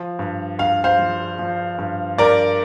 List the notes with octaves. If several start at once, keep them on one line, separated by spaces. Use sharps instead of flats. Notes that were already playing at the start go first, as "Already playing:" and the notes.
Already playing: F3
G2
G2 F5
C5 F5
F3
F3
G2
G2 A#4 D5